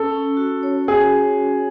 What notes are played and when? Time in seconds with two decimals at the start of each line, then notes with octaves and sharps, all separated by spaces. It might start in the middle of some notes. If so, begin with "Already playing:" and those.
Already playing: C#4 A4
0.11 C#4
0.37 F#4
0.63 C#5
0.88 F#4 G#4